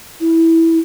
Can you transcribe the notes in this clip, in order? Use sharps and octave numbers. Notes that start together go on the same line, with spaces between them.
E4